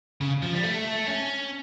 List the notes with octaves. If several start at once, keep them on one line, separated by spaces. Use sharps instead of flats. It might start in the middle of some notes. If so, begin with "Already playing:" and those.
C#3
F3
G3
A3
C#4